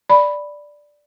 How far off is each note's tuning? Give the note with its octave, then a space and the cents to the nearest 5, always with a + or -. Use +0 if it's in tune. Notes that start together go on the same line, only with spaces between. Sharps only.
D5 +0 B5 +0